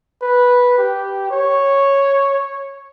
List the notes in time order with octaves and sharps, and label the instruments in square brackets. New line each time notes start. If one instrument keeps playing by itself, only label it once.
[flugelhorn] B4
G4
C#5